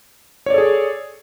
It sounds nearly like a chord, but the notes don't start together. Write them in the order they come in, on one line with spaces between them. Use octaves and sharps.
C#5 D5 A4 G#4